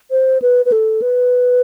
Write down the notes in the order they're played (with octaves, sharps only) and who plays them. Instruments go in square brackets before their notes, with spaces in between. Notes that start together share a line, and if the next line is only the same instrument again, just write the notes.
[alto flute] C5
B4
B4
A4
B4